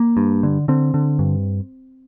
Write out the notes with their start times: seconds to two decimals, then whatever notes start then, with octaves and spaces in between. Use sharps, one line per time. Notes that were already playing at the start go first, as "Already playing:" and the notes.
Already playing: A#3
0.17 G2
0.43 D3
0.68 D3 C4
0.94 D3
1.19 G2